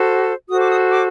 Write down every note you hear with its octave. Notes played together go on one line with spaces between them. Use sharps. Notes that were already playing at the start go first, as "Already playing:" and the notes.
Already playing: F#4 A4 C5
F#4 A4 C5 D#6
D6
D#6
D6